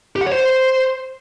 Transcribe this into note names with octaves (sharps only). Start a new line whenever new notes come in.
G4
F#5
C#5
C5